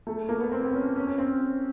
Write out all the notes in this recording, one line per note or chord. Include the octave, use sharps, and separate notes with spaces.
A3
A#3
B3
C4
B3
C#4
C#4
C#4
C4